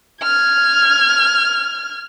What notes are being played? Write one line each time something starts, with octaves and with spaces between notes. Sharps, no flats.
F6 G#6